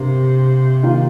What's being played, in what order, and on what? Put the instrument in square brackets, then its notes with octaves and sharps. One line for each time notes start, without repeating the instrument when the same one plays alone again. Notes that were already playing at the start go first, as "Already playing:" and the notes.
Already playing: [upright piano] G2 G3 C4 A#4 [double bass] C3
[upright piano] D#3 A#3 F4